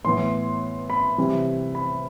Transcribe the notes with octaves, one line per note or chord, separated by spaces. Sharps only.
A2 E3 B3 C6
B5
C3 E3 G3
B5